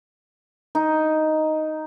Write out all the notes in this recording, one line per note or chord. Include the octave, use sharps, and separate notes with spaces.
D#4